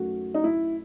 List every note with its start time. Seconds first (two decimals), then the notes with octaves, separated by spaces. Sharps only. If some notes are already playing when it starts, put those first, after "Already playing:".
Already playing: F#2 D#3 F#3 A3 F#4
0.35 D#4
0.44 E4